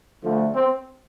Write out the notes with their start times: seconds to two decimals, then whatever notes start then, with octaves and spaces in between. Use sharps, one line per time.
0.23 D2 D3 F3 A3
0.55 C4